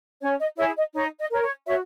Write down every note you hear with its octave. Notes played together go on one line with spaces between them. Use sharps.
C#4 C#5
D#5
E4 G#4 C#5 E5
D#5
D#4 C#5
D#5
A#4 C#5
C#5
F#4 C#5 E5